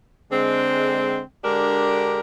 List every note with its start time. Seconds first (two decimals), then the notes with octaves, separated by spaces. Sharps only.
0.31 D3 G#3 C4
1.43 D3 G#3 D4 G4 A#4